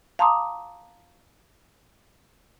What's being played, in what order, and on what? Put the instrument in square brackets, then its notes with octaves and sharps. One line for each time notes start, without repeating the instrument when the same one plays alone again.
[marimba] F5 A5 A#5 C6 D6 D#6